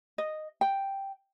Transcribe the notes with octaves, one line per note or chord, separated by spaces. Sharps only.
D#5
G5